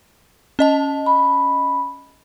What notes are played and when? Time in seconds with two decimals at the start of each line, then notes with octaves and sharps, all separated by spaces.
0.59 C#4 D#5 A5
1.06 B5